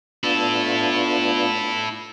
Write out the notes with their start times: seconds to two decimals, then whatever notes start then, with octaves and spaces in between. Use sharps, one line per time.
0.24 B3 D4 E4 F4 A4